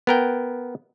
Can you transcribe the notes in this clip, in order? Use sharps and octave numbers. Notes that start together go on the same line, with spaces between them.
B3 A#4 G5